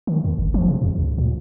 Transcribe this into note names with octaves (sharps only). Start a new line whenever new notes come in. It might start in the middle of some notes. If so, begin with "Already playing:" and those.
D#3
E2
F#1
F3
C3
F2
D2
A#2